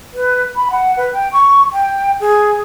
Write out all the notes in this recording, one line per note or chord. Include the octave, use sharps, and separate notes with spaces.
B4
B5
F#5
B4
G5
C#6
G5
G#4